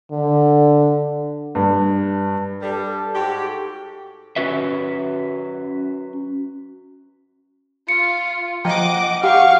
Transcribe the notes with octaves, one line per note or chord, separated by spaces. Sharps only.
D3
G2
G2 G3 A4
G#2 F#4 G4
C#4 F#4 B4 E5
F4 C#7
F3 D#5 F#5 G5 D6
G4 F5 F#5 C#6